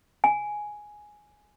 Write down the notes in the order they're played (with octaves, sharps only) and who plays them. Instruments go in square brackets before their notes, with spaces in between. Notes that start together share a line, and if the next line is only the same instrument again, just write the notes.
[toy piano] G#5